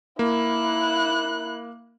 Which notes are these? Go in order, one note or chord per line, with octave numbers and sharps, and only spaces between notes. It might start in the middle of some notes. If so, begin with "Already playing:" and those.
A#3 E4 F#6